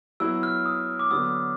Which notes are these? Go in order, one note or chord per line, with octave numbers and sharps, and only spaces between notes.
F#3 B3 E4 E6
F6
D#6
D6
D3 F#3 B3 D#6